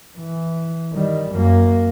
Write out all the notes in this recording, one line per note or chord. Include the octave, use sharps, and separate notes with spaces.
E3
D#3 G3
F#2 A#3